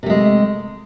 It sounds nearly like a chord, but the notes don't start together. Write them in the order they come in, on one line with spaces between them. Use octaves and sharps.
C3 A3 G#3